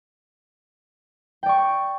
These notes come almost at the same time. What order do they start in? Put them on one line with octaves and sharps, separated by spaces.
G5 D5 C#6